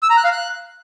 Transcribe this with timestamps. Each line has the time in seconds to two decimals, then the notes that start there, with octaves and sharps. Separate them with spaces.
0.03 E6
0.10 A#5
0.17 F#6
0.24 F5
0.32 F#6